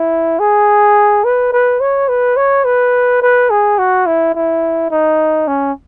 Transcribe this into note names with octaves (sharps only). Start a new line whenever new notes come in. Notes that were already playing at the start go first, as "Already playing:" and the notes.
Already playing: E4
G#4
B4
B4
C#5
B4
C#5
B4
B4
G#4
F#4
E4
E4
D#4
C#4